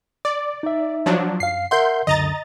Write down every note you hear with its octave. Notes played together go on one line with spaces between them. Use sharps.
D5 D6
D#4 E5
F3 F#3 D4
F#2 F5 C7
A#4 E5 F#5 C6 G6
C#2 F#2 D3 D#5 A#5 A6